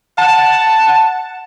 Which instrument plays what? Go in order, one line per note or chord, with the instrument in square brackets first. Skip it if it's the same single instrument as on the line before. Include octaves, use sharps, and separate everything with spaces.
[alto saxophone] F#5 [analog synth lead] A5